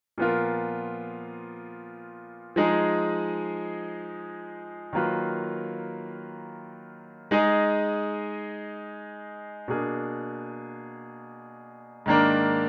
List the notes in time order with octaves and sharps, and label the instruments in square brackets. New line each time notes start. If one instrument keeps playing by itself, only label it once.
[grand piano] A#2 F3 B3 F4 A#4
F3 G#3 D#4 G#4
D#3 F#3 A#3 F4 B4
G#3 D#4 G#4 D#5
B2 A#3 D4 G#4
G#2 D#3 A#3 D4